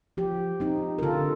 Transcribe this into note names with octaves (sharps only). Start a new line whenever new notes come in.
F3 G4
C4 D#4
A#4
D3 F4 A4